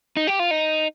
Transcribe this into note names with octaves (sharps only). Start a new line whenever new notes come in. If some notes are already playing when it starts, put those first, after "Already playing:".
D#4
G4
F4
D#4